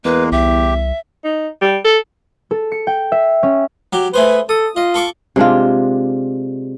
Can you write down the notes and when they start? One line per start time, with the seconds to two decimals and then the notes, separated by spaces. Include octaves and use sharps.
0.05 E2 G#3 A#3 B4
0.32 C2 G4 E5
1.24 D#4
1.62 G3
1.85 A4
2.51 A4
2.72 C#7
2.87 G5
3.12 E5
3.43 C#4
3.93 F#3 G4
4.14 A3 G#4 B4 C5
4.49 A4 D#6
4.76 F4 D#5
4.94 A4 C#6 D6
5.36 C3 G#3 D4 F4